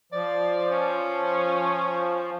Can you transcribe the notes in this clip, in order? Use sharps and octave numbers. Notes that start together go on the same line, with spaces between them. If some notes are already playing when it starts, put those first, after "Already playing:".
F3 D5
C#4